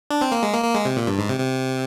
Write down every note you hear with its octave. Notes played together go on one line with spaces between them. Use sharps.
D4
C4
A#3
G#3
A#3
A#3
G#3
C3
A#2
G2
G#2
C3
C3